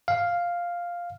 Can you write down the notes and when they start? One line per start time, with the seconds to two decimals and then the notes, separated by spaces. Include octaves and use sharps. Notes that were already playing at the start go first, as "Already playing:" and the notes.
0.08 F5